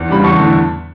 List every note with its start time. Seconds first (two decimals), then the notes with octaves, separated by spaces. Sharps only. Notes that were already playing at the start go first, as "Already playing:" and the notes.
Already playing: E2
0.09 C#3 G3 D4 B5
0.24 E2 A5 C#6
0.40 D3 A3 E4